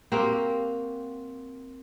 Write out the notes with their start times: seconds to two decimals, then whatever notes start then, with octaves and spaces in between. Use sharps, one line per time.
0.12 A#3 C4 F#4 G4